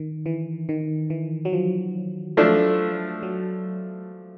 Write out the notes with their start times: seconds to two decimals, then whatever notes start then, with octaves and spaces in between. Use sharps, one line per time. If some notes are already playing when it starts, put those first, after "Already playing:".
Already playing: D#3
0.26 E3
0.69 D#3
1.10 E3
1.45 F#3
1.53 F3
2.37 F3 F#3 A3 D4
3.23 F#3